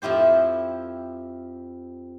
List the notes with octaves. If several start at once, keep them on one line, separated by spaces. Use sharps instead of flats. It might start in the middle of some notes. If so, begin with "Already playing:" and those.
F2 F3 E4 G4 C5